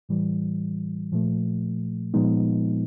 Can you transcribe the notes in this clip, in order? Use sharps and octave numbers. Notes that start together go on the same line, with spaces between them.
A2 E3 G3
A#2 F3 A3
A#2 F3 G#3 B3 D#4